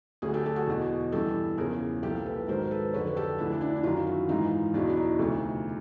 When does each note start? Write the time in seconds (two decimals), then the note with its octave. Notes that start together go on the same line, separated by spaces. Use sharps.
0.22 D2 D3 F#3 F#4 G#4
0.34 G4 A4
0.46 G4 A4
0.56 F#4 G#4
0.67 E2 B2 F#3
1.12 G2 E3 G4 A4
1.57 E2 C#3 F3 G#4 A#4
2.03 C2 A#2 F3 G4 A4
2.25 A4 B4
2.48 G#2 D#3 F#3 A#4 C5
2.71 A4 B4
2.93 F2 D3 F#3 B4 C#5
3.16 G4 A4
3.38 D2 D3 F3 D4 E4
3.61 D4 E4
3.76 E4
3.83 F#2 D#3 F#3 D#4 F4
4.07 E4 F#4
4.29 G#2 E3 D#4 F4
4.74 E2 B2 F#3 D4 E4
4.90 E4
4.97 D#4
5.19 D2 C3 F3